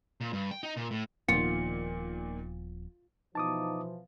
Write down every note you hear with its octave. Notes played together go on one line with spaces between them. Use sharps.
A#2
G2
G5
D#4
A#2
A2
D#1 A#2 D#3 F3 B3 F4 C#7
B2 E3 F3 D#4 A5 D6 D#6